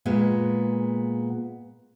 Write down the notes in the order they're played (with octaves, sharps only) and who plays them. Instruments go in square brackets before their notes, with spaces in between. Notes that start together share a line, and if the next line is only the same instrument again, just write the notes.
[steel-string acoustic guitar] A#2 G#3 B3